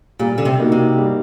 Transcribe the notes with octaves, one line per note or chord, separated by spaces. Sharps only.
A#2 G3
D3
C3
A#3 D#4 F#4
C3
G3